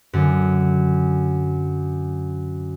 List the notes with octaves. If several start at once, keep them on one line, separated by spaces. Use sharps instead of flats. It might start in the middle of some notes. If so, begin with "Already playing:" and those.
F#2 D3